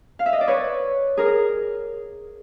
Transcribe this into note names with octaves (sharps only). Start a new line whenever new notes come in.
F5
E5
D#5
D5
B4 C#5
G#4 A#4